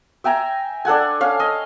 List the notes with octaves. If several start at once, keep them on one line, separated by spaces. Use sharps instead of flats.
E5 G5 G#5 A#5
D4 A4 F#5 G#5
C#4 F5
D#5 G#5